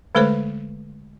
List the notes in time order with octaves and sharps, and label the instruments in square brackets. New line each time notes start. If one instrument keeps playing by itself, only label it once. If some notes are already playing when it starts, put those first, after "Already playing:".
[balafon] D3 G#3 A3 A4 B4 C5